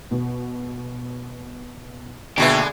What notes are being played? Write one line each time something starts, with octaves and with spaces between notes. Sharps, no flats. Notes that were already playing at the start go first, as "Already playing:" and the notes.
B2
B2 D3 G#3 A#3 B3 F#4 G4 E5